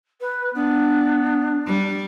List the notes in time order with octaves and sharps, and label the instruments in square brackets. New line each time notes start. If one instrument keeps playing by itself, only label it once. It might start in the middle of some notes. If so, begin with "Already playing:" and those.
[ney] B4
[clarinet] B3 [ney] D4
[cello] G3